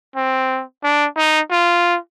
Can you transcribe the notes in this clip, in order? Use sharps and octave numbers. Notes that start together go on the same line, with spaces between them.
C4
D4
D#4
F4